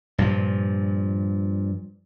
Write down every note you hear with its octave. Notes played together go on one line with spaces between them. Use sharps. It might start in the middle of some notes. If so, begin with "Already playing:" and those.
G2 A#2 F3